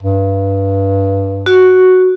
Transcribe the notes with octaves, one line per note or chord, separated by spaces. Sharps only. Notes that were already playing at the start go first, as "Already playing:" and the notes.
G2
F#4